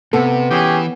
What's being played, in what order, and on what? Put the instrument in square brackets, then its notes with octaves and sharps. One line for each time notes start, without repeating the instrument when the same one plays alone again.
[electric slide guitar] C3 [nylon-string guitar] B3 [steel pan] A4
[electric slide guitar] E3 [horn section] C#4 G4 G#4